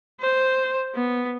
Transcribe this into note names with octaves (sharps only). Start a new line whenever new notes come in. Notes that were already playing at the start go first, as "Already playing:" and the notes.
C5
B3